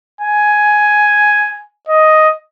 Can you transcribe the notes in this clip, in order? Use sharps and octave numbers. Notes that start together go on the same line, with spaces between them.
G#5
D#5